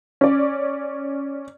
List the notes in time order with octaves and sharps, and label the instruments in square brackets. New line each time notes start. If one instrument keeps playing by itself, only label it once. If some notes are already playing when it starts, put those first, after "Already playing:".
[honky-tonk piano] C#4 D5